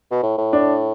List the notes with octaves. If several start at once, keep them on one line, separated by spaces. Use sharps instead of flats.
B2
A2
A2
D4